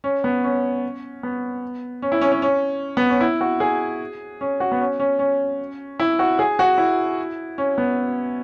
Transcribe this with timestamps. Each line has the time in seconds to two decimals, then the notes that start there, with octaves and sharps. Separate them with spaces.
0.04 C#4
0.24 B3
0.44 C#4
1.23 B3
2.02 C#4
2.12 E4
2.21 C#4
2.32 C#4
2.42 C#4
2.97 B3
3.10 C#4
3.21 E4
3.41 F#4
3.60 G#4
4.41 C#4
4.60 F#4
4.72 B3
4.80 C#4
5.00 C#4
5.19 C#4
6.00 E4
6.19 F#4
6.39 G#4
6.59 F#4
6.78 E4
7.58 C#4
7.78 B3